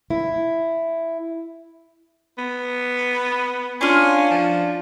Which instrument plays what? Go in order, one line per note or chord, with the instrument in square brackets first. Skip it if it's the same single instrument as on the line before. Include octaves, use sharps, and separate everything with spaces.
[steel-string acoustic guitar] E4
[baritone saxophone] B3
[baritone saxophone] C#4 [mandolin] D4 F4
[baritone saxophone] F3